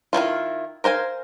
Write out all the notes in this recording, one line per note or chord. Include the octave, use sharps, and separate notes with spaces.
D#3 F3 E4 F4
A#4 C5 F5 G#5